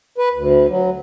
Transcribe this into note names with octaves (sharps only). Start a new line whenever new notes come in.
B4
D2
F#3